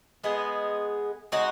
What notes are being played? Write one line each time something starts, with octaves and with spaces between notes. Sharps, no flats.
G#3 B3 G#4
G#3 D#4 F#4